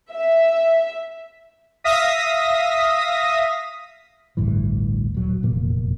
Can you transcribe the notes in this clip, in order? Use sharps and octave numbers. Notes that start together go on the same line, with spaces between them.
E5
E5 F5 D#6 A#6 B6
A1 D2 G2 E3
D#1 F#3
F1 E2 A#2 A#3